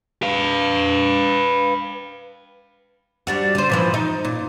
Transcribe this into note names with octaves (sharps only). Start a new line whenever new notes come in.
B4 F5
G3 D4 F#4
D3 C5
A#2 E3 F3
D#4
A#2